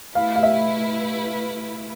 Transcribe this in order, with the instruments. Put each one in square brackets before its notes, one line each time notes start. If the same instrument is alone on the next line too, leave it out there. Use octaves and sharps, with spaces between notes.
[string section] A3 E4 B4 [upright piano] F5
[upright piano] F5
E5